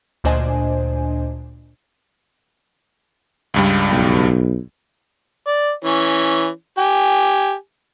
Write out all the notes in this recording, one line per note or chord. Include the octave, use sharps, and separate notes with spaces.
D2 A#2 D4 C5 D#5 G#5
C#2 G2 G3
B1
D5
E3 C#4
G4 G#5